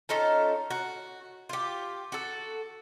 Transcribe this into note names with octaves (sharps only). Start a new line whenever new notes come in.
C#4 D#4 F4 A4
F#4
F4 G4
F#4 A4